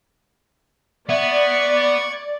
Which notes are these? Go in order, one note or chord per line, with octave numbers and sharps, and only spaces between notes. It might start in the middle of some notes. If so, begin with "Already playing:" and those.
B3 D5 E5 C#6 G#6